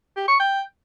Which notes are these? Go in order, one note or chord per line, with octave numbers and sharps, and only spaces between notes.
G4
C#6
G5